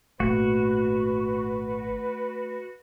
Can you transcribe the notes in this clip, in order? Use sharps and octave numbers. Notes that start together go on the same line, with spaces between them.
G#1 A#2 A3 F#4 B4